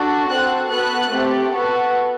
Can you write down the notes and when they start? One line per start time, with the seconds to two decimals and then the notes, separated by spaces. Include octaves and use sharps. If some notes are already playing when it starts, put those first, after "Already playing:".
Already playing: D4 F#4 A4
0.29 C4 F#4 A4 F#6
0.70 B3 F#4 A4 F#6
1.11 A3 C4 G4
1.51 B3 F#4 A4